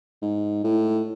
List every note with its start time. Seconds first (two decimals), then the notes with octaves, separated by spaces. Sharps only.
0.22 G#2
0.64 A2